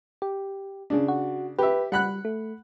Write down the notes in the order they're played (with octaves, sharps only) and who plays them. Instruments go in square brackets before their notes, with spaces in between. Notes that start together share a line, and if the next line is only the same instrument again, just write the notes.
[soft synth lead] G4
[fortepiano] C#3 D4
[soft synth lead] F#4
[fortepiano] G4 E5 [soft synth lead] B4
[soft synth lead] G3 [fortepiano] F#5 B5 F#6
[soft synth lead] A3